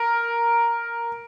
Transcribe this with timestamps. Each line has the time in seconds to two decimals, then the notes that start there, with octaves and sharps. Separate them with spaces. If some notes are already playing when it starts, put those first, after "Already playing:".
Already playing: A#4